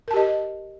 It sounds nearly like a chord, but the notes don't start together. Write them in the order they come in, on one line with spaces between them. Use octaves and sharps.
A#4 A5 G4 D#5